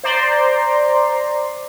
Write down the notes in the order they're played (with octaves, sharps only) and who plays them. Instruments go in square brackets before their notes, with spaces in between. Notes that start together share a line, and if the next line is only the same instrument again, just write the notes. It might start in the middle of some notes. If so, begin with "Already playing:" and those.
[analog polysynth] C5 D5 A#5 C6